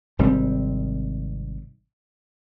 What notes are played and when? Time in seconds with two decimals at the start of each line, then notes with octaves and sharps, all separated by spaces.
0.19 G#1 C3 G3 C4